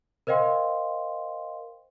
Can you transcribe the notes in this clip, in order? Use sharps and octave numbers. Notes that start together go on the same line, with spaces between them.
A#4 C5 D#5 F5 G5 C6